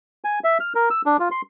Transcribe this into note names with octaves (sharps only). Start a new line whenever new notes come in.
G#5
E5
F6
A#4
E6
D4
F4
C6